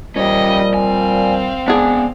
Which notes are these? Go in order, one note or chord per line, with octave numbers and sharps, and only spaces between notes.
A#2 F3 G3 C#4 G4 D#5
C4 F5 G#5
G#3 B3 D4 G#4